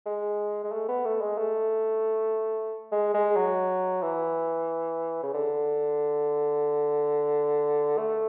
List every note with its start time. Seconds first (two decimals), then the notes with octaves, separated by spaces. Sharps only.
0.06 G#3
0.64 G#3
0.72 A3
0.88 B3
1.05 A3
1.21 G#3
1.38 A3
2.92 G#3
3.14 G#3
3.36 F#3
4.02 E3
5.23 C#3
5.34 D3
7.98 A3